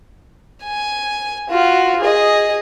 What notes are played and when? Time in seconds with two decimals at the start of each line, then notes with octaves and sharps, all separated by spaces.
0.64 G#5
1.50 F4 F#4
2.00 G#4 D#5